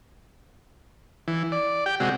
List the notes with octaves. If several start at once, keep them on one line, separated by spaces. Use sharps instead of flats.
E3
D5
G4 G5
C3 G#3 F#4